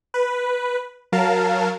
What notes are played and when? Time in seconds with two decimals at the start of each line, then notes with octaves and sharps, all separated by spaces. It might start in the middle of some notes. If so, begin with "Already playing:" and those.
0.14 B4
1.12 F#3 A#4 F5 A5